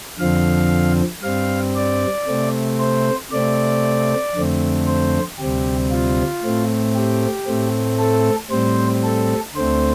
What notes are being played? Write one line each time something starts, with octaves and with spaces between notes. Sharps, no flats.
F2 D3 F3 C4 F5
G2 G3 C4 F5
D5
C3 A3 C4
C5
C3 A3 C4 D5
F2 D3 A3 C4
C5
D2 C3 G3 C4 G4
F4
A2 A3 C4
G4
A2 A3 C4
A4
A2 G3 C4 C5
A4
D2 D3 A3 C4 C5